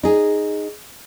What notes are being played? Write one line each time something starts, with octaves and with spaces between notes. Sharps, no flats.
D#4 G#4